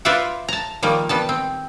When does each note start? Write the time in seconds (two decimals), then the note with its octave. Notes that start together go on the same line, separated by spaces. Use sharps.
0.05 F4 B4 C5 D5 E5 F#5
0.48 A5 A#5
0.83 D#3 F3 G3 A#3
1.09 G3 B3 A5
1.29 C4